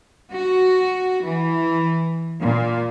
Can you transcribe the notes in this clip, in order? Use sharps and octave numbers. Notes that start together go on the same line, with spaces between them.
F#4
E3
A#2